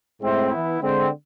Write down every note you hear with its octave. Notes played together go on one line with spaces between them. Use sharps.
A2 G#3 C4 E4
E3 B3 E4
D3 G#3 C4